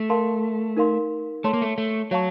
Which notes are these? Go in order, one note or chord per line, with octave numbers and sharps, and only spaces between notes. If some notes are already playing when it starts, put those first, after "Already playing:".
Already playing: A3
A#4 F5 A5 C6
D#4 A#4 F5 C6
A3 C#5 A5 C6
A#3
A3
A3
F#3 C#5 F5 A5 C#6